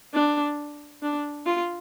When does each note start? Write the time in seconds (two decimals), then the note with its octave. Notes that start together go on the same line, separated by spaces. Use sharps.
0.14 D4
1.02 D4
1.46 F4